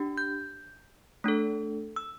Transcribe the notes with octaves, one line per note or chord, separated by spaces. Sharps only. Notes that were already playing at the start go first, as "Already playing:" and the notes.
Already playing: D4 G4
G6
A3 D4 A4
E6